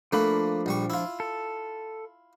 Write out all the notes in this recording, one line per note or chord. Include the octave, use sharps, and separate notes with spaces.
F3 A3 A#3 D4 B4 B5
A#1 G3 C#6
E4 F4
A4